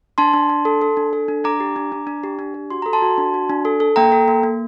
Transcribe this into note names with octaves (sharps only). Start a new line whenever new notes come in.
D4 A5 C6
D4
D4
A4
A4
D4
A4
D4
D4 A#5 D6
G4
D4
D4
D4
G4
D4
G4
F#4 C6
A4 A#5
A5 C6
F#4
D4
F#4
D4
A4
A4
A#3 G5 A#5
A4
A#3
A#3